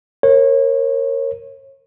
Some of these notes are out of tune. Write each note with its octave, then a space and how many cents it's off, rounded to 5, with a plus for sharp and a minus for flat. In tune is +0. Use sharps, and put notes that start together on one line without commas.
A#4 +0 C#5 -30